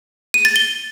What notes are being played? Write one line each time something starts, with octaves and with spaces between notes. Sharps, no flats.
D#7
A6
G7